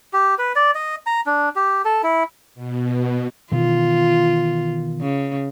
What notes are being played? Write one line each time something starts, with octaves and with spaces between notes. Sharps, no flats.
G4
B4
D5
D#5
A#5
D4
G4
A4
E4
B2
B2 D#3 E3 F4
C#3